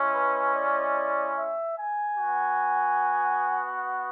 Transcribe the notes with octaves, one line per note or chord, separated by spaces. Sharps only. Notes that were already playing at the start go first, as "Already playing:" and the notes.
Already playing: G#3 C#4 E4
B4
D5
E5
G#5
B3 F#4